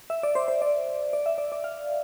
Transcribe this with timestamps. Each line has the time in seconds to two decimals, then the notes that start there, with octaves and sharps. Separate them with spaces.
0.10 E5
0.23 D5
0.35 C5
0.48 C5
0.62 D5
1.13 D5
1.26 E5
1.38 D5
1.52 D5
1.64 F5